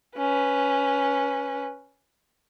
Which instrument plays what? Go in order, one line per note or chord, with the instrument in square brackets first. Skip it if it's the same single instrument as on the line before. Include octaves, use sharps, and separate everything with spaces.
[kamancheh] C#4 B4